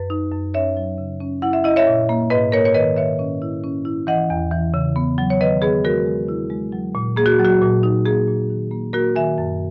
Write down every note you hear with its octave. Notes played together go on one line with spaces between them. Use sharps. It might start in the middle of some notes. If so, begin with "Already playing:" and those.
Already playing: F#2 B4
D#4
F#2
C#4 C#5 E5
F#3
C#3
C#4
E4 F#5
E5
E4 D#5
C#5 E5
A#2
A#3
G#2 B4 D#5
A#3 A#4 C#5
C#5
D#3 B4 D#5
D#3 C#5 E5
C#4
E4
C#4
E4
E3 D#5 F#5
E2
E3
C#3
B3
F#3
C#5
D#3 B4 D#5
B3 G#4 B4
G#3 F#4 A#4
G#3
E4
G#3
F#3
A#2
A#3 G#4
F#4
F#3
F#4
A#2
D#4
A#3 G#4
A#2
D#3
A#3
A#3 F#4 A#4
D#3 E5 G#5
F#2